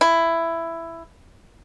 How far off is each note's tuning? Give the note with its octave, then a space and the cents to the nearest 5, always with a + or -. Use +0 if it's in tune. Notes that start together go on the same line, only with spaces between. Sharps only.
E4 +10